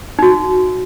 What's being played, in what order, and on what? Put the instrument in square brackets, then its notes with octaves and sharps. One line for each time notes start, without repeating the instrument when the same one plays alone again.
[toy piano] D#4 F#4